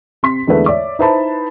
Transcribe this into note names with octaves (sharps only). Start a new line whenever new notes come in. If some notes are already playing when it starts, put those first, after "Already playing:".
C3 C6 B6
E2 D3 G#3 A3 B4
C#5 D5 E5 D6
D#4 E4 B4 C5 A5 B5